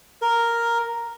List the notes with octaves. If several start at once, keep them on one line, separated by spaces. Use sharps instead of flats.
A#4